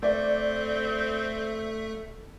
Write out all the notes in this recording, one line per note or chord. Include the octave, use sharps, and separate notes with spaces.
A3 C4 A4 D5 E5